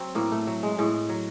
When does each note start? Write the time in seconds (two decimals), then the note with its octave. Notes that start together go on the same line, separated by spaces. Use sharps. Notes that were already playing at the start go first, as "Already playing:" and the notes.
Already playing: F#3 C4
0.15 A2 A#3
0.32 A3
0.47 F#3
0.63 G#3
0.78 A2 G#3
1.09 F#3